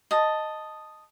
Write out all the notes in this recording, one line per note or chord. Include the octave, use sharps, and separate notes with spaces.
D#5 A5